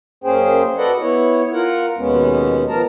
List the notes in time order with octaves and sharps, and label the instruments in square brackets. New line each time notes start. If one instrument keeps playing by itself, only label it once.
[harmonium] F#2 A#3 C#4 G#4 C5 G5
F#4 A4 B4 D5 D#5 F#5
B3 E4 C#5
F4 A#4 F#5
D#2 B2 G#3 B3 C#4
F3 B3 A#4 A5 A#5